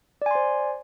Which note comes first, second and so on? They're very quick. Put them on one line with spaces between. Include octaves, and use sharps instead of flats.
D5 G#5 C6 C5